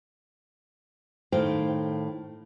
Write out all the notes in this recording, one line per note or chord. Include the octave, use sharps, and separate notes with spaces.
A2 D#3 C5 F5 G5